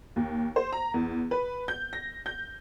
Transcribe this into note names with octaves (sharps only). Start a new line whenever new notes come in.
D#2
C5
A#5
E2
B4
G6
A#6
G6